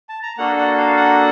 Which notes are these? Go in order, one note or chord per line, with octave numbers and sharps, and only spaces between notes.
A5
A#5
A#3 D4 F#4 A4 F#5
F#5
F5
F#5